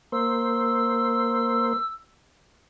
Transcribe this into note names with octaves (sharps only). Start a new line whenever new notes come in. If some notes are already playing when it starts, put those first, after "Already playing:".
A#3 C5 E6